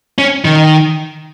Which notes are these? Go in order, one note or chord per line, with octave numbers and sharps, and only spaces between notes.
C#4
D#3